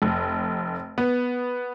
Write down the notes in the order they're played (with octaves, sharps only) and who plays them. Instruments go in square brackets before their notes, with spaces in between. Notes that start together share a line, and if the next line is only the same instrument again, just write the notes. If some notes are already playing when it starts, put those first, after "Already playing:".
[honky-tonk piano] F1
B3